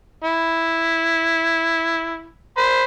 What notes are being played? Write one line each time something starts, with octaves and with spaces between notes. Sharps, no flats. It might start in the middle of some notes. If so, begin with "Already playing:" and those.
E4
C5 B5